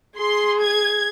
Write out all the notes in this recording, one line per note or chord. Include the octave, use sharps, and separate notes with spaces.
G#4 C6
G#6